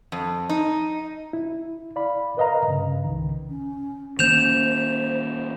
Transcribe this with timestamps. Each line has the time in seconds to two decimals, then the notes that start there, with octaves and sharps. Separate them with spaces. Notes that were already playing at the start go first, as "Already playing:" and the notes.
0.12 F2
0.49 D#4
1.33 E4
1.96 D5 F5 B5
2.37 A#4 B4 D#5 F5 A#5
2.68 G2 C#3
3.04 C2 D#3
3.49 C#4
4.19 D#3 A#3 C#4 C5 G6 E7 F7